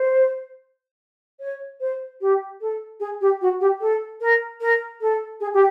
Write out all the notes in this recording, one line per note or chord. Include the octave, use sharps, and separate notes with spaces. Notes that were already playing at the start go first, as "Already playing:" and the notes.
Already playing: C5
C#5
C5
G4
A4
G#4
G4
F#4
G4
A4
A#4
A#4
A4
G#4
G4